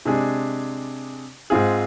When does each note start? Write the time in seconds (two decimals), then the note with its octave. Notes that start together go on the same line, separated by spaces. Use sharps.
0.05 C3 G#3 D4 G#4
1.50 G#2 G#3 C4 F4 G#4